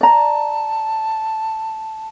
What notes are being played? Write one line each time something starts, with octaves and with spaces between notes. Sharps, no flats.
D5 A5 A#5